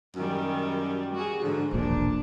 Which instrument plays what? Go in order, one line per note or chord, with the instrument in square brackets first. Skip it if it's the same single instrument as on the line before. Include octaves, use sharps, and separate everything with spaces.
[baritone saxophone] F#2 [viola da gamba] D#3 G3
[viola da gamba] F#4 G#4
[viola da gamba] G#2 F3 [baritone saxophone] D3
[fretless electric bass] E1 A#1 A#2 [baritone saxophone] F3 [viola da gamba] D4